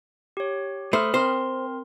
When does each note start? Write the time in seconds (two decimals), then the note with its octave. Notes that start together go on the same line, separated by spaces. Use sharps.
0.37 G4 C#5
0.93 A3 C5 B5 D#6 F6
1.14 C4 A#4 C5 C6